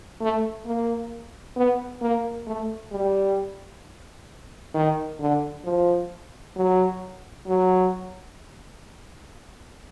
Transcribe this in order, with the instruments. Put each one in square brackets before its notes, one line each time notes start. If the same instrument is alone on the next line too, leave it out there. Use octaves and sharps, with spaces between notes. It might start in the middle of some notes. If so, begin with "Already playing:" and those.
[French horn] A3
A#3
B3
A#3
A3
G3
D#3
D3
F3
F#3
F#3